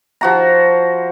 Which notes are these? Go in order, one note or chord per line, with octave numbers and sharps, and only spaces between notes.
F3 F#4 A#5